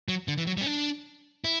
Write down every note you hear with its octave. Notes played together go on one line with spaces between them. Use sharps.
F#3
D3
E3
F#3
G3
C#4
D4
E4